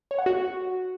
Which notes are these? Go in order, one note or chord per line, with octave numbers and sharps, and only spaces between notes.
C#5
F#5
F#4